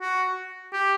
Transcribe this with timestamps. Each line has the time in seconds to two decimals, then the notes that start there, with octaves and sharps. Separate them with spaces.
0.01 F#4
0.73 G4